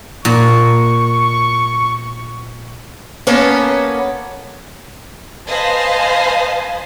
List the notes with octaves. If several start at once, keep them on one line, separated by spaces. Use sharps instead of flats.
A#2 C#6
A#3 B3 C#4 A4 C#5
B4 C5 D#5 F5 G#5 A5